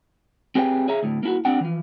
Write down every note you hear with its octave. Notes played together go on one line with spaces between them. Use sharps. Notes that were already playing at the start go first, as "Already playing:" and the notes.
C4 G4 G#4 B4 C#5 G5
G#4 C#5 E5 A#5
D2 A2
A#3 E4 F#4
C4 D4 G4 F#5 G5
E3 F3